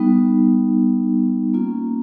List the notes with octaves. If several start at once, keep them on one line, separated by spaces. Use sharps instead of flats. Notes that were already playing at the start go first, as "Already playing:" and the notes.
Already playing: G3 B3 D#4
A#3 C#4 F4